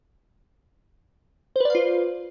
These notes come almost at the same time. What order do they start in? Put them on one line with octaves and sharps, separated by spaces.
C5 B4 D5 F5 F4